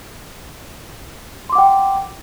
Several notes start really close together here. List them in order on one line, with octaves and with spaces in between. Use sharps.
C6 D6 F#5 G5